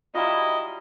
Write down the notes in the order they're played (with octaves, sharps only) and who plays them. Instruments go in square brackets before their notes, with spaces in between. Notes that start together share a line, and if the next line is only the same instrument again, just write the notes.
[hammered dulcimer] F#3 G3 [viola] E4 [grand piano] F4 G7 [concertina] D#5